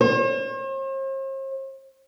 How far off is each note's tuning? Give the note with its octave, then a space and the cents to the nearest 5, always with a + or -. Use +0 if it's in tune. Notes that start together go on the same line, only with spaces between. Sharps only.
C5 +45